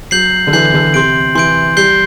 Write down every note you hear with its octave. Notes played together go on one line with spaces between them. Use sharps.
F#3 G6 C7 F#7
D3
E3 G6 C7 F#7
D3
C3 C6 G6 D7
E3 C6 G6 D7
G3 G6 C7 G7